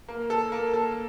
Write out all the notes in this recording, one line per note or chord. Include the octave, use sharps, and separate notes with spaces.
A#3
A4
A#3
A4